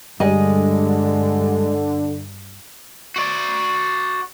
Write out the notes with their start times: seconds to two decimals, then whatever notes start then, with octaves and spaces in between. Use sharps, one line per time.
0.20 G2 D3 G3 G#3 D#5
3.16 F#4 D5